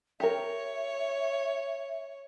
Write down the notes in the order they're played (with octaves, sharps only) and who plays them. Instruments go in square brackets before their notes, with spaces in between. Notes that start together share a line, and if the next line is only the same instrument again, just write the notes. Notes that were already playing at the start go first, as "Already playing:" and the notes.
[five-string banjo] G4 A#4 [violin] C#5 [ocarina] E5